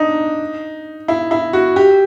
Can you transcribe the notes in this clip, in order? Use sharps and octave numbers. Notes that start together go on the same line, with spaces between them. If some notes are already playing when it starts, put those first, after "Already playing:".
Already playing: D4 D#4
E4
E4
F#4
G4